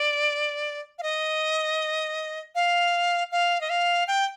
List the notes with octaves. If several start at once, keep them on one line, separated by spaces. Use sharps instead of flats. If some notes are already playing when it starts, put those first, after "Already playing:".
Already playing: D5
F5
D#5
F5
F5
D#5
F5
G5